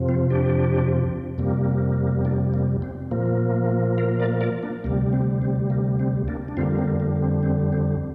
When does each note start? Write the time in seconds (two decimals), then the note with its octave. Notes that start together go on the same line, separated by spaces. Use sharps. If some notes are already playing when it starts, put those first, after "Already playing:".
Already playing: F2 C3 F3
0.09 C4 F4
0.30 D4 G4
1.38 F2 C3 G3 A#3
2.25 A#3 D4
2.54 A#3
2.82 C4
3.11 A#2 F3 A#3
3.98 F4 A#4
4.19 A#4 D5
4.41 A#4 D5
4.63 A#3 D4
4.84 D2 C3 G3 A#3
5.13 C4
5.42 C4
5.70 A#3
6.00 C4
6.28 A#3 D4
6.48 D4
6.57 F2 D3 G3 A#3 C4 F4
6.78 C4
7.00 A#3
7.22 C4
7.43 C4
7.72 C4